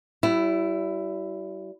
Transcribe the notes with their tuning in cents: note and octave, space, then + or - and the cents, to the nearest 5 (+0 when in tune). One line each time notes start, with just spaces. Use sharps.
G3 -40 E4 +10